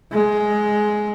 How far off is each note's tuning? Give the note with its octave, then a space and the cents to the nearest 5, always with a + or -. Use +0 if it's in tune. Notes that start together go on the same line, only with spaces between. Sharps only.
G#3 +10